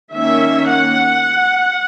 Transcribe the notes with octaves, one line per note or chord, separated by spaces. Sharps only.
D#3 A#3 C#4 E5
F#5